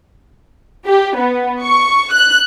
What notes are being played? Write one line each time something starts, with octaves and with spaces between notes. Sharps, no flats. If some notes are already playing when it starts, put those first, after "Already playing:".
G4
B3
C#6
F#6